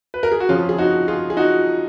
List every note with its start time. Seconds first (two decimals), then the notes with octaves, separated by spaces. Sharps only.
0.14 B4
0.23 A#4
0.31 G#4
0.40 F#4
0.49 F2 C#3 F3 C#4 F4
0.69 G#4
0.78 D#4 F#4
1.08 F4 G#4
1.30 G#4
1.37 D#4 F#4